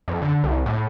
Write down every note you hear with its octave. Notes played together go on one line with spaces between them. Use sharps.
F2
D3
C2
A2